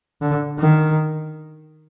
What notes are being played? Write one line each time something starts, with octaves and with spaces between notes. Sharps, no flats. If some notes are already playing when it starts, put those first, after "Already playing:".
D3
D#3